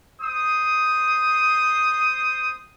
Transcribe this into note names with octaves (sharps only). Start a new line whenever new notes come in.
C5 D#6